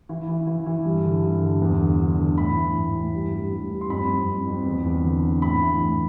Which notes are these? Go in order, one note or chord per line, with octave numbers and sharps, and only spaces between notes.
E3
E3
E3
E3
G2
D3
G2
D3
E2
D3
D3
D3
A2 B5
E3
A2
A2
G2
G2
G2
G2
C6
F2 B5
F2
F2
F2
E2
E2
D3
D3
A2 B5
E3
A2